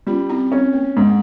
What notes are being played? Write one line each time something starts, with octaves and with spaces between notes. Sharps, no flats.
G3 C#4 F4
C4 E4
C4 C#4
A#3
G#2 G#3
A#3